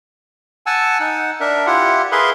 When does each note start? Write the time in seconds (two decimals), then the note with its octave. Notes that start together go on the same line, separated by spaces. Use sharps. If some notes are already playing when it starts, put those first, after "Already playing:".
0.66 F#5 G#5 A5 E6
1.00 D#4 F#5
1.40 D4 A#4 E5
1.66 E4 F4 G4 F#5
2.12 G#4 A#4 B4 E5 B5 C6